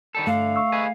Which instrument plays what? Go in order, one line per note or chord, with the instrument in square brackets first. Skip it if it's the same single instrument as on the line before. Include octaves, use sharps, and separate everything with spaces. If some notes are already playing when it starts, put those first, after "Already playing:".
[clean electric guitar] D#3 G3 A4
[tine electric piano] G2 [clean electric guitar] D3 [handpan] A3 [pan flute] F5
[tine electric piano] C#6 E6
[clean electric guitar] G#4 B4 D#5